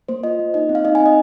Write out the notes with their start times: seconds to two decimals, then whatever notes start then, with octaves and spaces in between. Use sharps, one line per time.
0.08 A#3 C5
0.23 F4 D#5
0.39 A#3
0.54 D#4 D#5
0.69 C4
0.75 F5
0.85 D#4 D#5
0.95 G#5
1.01 C4
1.06 D#5